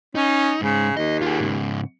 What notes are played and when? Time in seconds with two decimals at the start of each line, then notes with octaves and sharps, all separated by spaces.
0.15 C#4 D#4
0.62 G#2 C#3 G#3
0.97 D#2 D#5
1.21 F4 G#4
1.40 G#2 C#3